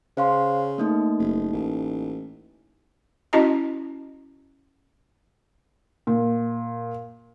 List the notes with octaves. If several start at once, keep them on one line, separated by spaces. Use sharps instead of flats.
C#3 C5 F5 C6
A3 A#3 D#4
F#1
A1
C#4 E4 F#4 D#5 A5 A#5
A#2